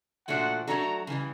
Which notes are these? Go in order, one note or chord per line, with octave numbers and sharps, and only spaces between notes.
A#2 F3 A3 D4 F#4 F#5
F#3 A3 D4 F#4 A4 A#5
C#3 E3 G3